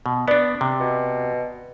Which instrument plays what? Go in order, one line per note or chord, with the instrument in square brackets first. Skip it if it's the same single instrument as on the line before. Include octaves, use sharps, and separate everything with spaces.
[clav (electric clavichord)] B2
[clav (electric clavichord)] B3 D4 [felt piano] D5
[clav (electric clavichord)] C3
[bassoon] B2